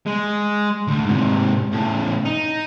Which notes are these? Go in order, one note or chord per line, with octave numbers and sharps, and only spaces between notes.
G#3
D2
G#2 C3
A2 C#3
D#4